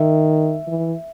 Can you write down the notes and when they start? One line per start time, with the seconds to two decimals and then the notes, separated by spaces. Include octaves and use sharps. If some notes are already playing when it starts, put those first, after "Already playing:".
Already playing: D#3 E5
0.68 E3